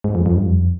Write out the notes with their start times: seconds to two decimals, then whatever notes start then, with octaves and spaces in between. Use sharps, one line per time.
0.04 G#2
0.15 F2
0.26 F2
0.36 G2
0.47 F2